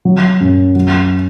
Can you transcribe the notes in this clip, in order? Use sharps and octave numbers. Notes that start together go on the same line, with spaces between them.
F#3
F#2
F#3